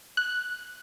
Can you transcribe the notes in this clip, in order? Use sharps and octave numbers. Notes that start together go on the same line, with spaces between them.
F#6